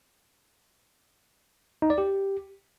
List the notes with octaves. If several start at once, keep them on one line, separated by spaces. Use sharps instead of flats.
D#4
D5
G4